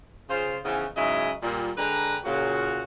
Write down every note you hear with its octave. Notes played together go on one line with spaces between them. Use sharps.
C#3 F4 C5
C#3 E3 F3 B3 C#4 D#4
G#2 C#3 F#3 E4 G#4 D#5
A#2 G3
D3 G#3 D4 B4 G5 A#5
A#2 C#3 F#4